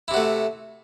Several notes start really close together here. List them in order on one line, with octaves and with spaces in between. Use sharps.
E4 C3 F#4 A3